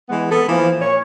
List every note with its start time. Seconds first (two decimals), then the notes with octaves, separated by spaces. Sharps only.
0.09 E3 G#3 B3
0.30 B3 A4
0.49 E3 F3 A#3
0.81 A#2 C#5